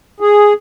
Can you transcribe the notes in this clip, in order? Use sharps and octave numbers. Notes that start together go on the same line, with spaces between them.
G#4